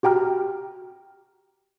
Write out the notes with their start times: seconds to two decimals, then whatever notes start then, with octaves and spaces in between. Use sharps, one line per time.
0.03 F#4 G4 G5 A#5 F6